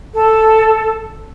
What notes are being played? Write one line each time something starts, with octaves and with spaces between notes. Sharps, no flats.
A4